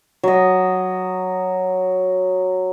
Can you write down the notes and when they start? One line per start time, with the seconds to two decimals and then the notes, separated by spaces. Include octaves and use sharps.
0.23 F#3 D#5